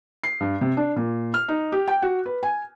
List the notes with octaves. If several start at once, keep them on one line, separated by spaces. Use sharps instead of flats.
C7
G2
C3
D4
A#2
F6
D#4
G4
G5
F#4
B4
G#5